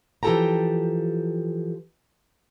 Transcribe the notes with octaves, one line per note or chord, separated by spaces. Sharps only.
E3 F3 G4 A4 G5 A#5